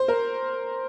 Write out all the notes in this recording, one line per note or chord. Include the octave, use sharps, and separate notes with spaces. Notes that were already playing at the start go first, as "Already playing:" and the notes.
Already playing: C5
A#4